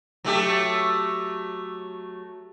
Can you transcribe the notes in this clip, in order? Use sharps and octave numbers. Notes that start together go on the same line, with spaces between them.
F#3 A3 G4